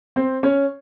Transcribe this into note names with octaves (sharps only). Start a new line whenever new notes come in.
C4 C5
C#4 C#5